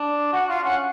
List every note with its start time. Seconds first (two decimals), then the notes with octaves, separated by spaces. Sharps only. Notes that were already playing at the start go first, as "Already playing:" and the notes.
Already playing: D4
0.33 F#4 F#5
0.48 F4 F5
0.63 C#4 F#5